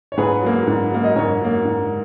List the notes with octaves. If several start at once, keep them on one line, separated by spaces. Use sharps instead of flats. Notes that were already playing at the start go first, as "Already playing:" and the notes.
C#5
G#2 G#4 B4
F#3 A#3
G#2
F#3 A#3
D#5
G#2 A#4 C#5
F#3 A#3
G#2